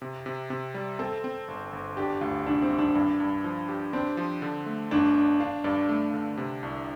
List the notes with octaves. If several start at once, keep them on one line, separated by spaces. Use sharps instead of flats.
C3
C3
C3
G3
C4 A4
C4
G1
G1
D4 G4
D2 F4
C2 D4
C4
C2
D4
G2 D4
G2
F3
G4
C4 D4
F3
D3
A3
G1 D4
D4
D4 F5
G2 D5
A3
D3
C3
C2